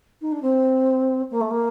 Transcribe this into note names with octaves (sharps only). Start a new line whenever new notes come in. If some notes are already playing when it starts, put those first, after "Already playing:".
D#4
D4
C4
A#3
A3
A#3